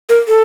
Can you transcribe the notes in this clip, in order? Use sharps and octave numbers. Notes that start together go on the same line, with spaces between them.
A#4
A4